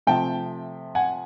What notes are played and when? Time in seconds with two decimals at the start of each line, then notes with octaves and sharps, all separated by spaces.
0.07 C3 F3 A3 G5 A5
0.95 F#5 G#5